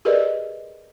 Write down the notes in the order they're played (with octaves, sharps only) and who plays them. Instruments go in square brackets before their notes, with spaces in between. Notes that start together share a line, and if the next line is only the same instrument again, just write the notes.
[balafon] G4 G#4 A#4 B4 D5 D#5